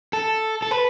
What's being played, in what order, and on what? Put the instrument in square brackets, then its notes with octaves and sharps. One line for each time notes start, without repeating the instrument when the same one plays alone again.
[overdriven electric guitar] A4
A4
B4